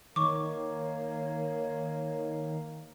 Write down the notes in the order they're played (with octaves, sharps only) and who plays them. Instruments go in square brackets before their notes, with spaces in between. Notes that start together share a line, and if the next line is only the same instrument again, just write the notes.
[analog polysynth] D#3 [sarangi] A#3 [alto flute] C#5 [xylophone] C#6 D6